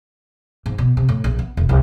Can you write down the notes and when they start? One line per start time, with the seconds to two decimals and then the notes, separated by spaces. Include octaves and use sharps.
0.66 G#2
0.78 B2
0.97 C3
1.09 A2
1.24 A#1
1.39 B3
1.57 E1
1.69 C2